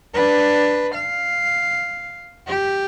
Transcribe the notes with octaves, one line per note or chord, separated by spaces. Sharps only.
D4 B4
F5
G4